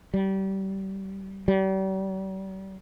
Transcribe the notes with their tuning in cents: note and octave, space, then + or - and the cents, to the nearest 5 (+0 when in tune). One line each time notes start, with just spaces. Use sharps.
G3 -25
G3 -40